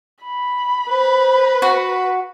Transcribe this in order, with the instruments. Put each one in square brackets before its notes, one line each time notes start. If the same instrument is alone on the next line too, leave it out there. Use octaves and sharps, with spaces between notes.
[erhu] B5
[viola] B4 [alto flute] C5
[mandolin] F#4